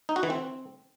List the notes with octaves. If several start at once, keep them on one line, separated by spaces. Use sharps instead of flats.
D#4
F#4
E3
C4